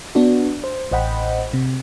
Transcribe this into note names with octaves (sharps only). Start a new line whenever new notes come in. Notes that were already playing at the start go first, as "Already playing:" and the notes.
B3 D4 F#4
C5
A1 C5 D#5 F#5 G5 B5
C3